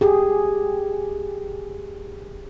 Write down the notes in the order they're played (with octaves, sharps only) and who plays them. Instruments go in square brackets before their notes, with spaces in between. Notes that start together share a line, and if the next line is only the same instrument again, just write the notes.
[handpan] G4 G#4